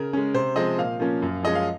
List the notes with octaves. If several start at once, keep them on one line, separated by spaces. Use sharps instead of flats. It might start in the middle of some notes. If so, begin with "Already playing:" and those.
Already playing: C#3 A#4
G#3 C#4
C3 C5
F3 G#3 C4 D#5
A#2 F5
F3 A#3 C#4
F#2
F3 G#3 C#4 D#5
F5